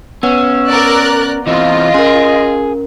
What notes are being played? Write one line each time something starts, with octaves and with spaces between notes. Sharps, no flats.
B3 C#4 B4 F#5 E6
A#4 D5 F#6
E3 C4 F4 D#5
C#4 G#4 A#4